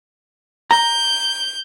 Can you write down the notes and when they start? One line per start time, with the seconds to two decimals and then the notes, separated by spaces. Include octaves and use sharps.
0.71 A#5 G6